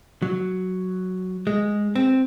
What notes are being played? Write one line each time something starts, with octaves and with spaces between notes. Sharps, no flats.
F#3
G#3
C4